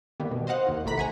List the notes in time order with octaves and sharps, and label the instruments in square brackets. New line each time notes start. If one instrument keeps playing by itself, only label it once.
[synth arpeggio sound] D#3 G3 A#3 B3
B2
C5 D#5 F5 F#5
D#2 D#3
A1 C3 A3 A#5 B5 B6
F#5 G#5 A#5